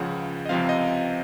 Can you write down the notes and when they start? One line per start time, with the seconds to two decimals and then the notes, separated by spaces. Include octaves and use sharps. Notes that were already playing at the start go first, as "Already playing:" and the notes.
Already playing: C#2 C#3 F3 F#5
0.45 D#5
0.49 C#2 C3 F3 C4 F5
0.69 D#5